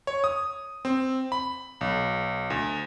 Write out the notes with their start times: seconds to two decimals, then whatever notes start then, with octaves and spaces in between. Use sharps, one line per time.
0.07 C#5
0.24 D#6
0.85 C4
1.32 B5
1.81 B1
2.50 D2